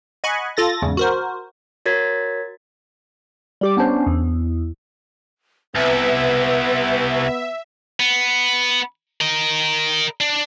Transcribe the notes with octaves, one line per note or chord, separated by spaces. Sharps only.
D#5 F#5 G#5 B5 C#6
F4 A4 A6 A#6
E2 G#2 C#3
F#4 A#4 C5
F#4 A#4 C#5 G#6 A6 B6
G3 G4 D6
B3 C#4 D4 C5
E2
C2 B3 B4 E5
B3
A#4 D#5
D4